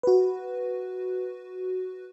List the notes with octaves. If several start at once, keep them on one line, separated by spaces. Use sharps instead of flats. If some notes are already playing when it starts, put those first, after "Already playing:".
F#4 B4